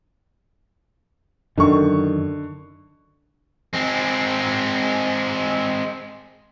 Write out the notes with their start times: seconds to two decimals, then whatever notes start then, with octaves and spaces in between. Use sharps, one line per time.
1.58 F#2 D3 D#3 C#6
3.75 G#3 C4